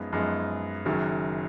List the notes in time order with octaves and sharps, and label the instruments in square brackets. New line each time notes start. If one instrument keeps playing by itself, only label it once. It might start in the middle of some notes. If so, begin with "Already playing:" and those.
Already playing: [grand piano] F#2 F3 G#3 B3 D#4
F#2 F3 G#3 B3 D#4
F#1 F#2 D#3 F#3